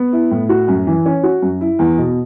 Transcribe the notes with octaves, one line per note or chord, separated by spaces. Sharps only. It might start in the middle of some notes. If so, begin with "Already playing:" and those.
Already playing: B3
E4
A2
F#4
F#2
E3
C#4
F#4
F#2
E4
E2
B2